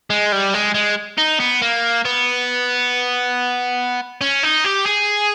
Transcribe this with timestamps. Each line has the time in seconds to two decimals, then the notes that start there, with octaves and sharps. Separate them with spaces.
0.10 G#3
0.32 G3
0.54 G#3
0.74 G#3
1.18 D#4
1.40 B3
1.62 A#3
2.05 B3
4.21 C#4
4.43 D#4
4.64 G4
4.86 G#4